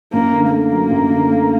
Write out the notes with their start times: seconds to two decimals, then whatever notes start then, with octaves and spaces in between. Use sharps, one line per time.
0.13 F#2 A#3
0.33 D3
0.51 A3 A#3
0.72 F#3
0.91 F#2
1.10 D3
1.30 A3